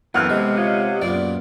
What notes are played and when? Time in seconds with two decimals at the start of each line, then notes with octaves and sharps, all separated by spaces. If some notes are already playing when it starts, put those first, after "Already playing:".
0.14 F#2 E3 B3 C4 A4 F#5 F6 F#6
0.30 C3 G#3
0.57 F4 C#5 D#5
1.01 F#2 A#2 B3 D5